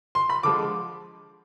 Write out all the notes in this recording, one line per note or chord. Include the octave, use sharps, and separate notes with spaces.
C6
B5
D3 F3 G#3 D6